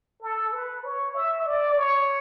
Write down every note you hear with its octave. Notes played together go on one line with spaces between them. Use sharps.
A4
B4
C#5
E5
D5
C#5